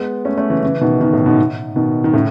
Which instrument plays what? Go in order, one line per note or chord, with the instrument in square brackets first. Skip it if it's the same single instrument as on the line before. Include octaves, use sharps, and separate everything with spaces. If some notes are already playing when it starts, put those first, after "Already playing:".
Already playing: [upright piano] G#3 B3
A3 C#4
A3 C#4
C#3 E3
C#3 E3
B2 D#3
B2 D#3
A2
G#2 B2
B2 D#3
D#3
A2 C#3